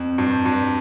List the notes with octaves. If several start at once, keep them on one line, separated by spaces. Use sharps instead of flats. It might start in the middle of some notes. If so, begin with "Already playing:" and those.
Already playing: F2
G2
G2